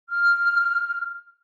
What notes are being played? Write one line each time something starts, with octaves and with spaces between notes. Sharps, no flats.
F6